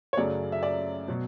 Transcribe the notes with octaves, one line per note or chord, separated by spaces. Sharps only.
C#5
F#2 C#3 F#3 A3 D5
E5
D5
B2 F#3